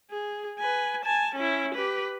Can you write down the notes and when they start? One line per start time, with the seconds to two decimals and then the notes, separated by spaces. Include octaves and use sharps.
0.10 G#4
0.59 B4 G#5
1.05 G#5 A5
1.35 C#4 E4
1.75 G4 B4